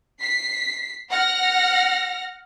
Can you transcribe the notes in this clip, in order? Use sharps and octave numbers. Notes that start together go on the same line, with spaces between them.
B6 C7
F#5 F6 A#6